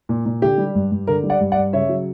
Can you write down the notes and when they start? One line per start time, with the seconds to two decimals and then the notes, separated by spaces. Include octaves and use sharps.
0.09 A#2
0.26 A#2
0.42 D3 G4
0.58 G3
0.75 G2
0.92 G2
1.07 D3 A#4
1.23 G3
1.30 D5 F#5
1.40 G2
1.52 D5 F#5
1.57 G2
1.73 C#3 C#5 E5
1.89 F#3